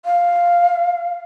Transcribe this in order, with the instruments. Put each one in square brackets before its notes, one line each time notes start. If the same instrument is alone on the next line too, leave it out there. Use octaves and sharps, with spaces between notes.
[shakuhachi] F5